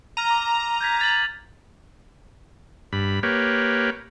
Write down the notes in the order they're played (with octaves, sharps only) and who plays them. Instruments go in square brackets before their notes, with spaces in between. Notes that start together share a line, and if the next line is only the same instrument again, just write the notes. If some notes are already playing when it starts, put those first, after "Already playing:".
[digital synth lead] A#5 [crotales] F6 D#7
[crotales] D6 F7
G6 G#6 B6
G#6 A6 F#7
[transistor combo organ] G2 B5
A#3 G4 B4 C#5